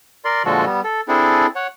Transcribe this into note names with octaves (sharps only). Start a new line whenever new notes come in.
A#4 D5 C6
A#2 D3 F3 G#3 F#4 A4
G3 B3
A4
C4 D4 E4 G#4 A4
C#5 F#5